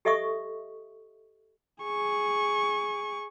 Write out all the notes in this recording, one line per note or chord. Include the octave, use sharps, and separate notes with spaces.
G4 A4 D#5 E5 C#6 D#6
G#4 C#6